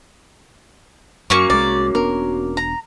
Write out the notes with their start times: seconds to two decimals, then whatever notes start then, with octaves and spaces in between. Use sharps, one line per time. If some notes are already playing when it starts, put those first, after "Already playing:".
1.30 F#2 A#3 C#4 F#4 C#6
1.50 C2 G#3 D5
1.95 E1 B3 D4 A#4
2.57 A#5